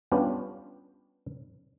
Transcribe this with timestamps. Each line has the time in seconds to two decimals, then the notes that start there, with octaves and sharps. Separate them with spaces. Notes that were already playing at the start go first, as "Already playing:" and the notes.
0.12 G3 B3 C#4 D4 F4 G4